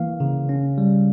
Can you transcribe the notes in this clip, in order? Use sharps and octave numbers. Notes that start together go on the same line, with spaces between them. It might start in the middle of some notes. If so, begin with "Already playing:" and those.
Already playing: E3 A#3 F5
C#3
C#4
G3